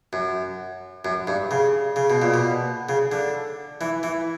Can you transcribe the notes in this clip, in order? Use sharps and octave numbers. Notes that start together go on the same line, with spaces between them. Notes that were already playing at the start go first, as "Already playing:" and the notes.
F#2
F#2
G2
C#3
C#3
B2
A#2
B2
C#3
D3
E3
E3